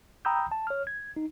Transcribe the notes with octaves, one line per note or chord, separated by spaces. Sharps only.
G5 A#5 B5 D#6 E6 G6
A5
C#5 F6
G#6
D#4